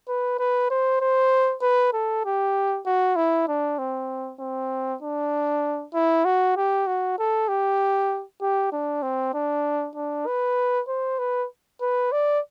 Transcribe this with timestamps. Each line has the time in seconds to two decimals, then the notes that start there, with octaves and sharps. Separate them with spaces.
0.08 B4
0.39 B4
0.71 C5
1.01 C5
1.62 B4
1.93 A4
2.25 G4
2.86 F#4
3.16 E4
3.48 D4
3.79 C4
4.40 C4
5.03 D4
5.94 E4
6.25 F#4
6.56 G4
6.87 F#4
7.19 A4
7.48 G4
8.41 G4
8.72 D4
9.03 C4
9.34 D4
9.96 D4
10.27 B4
10.88 C5
11.19 B4
11.81 B4
12.12 D5